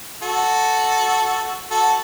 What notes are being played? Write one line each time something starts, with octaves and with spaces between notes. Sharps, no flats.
F#4 A4
F#4 A4